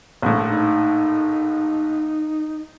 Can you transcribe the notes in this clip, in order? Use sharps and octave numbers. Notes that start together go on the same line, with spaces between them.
A#1 A2
D#4